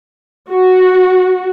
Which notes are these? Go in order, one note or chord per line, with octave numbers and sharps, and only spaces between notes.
F#4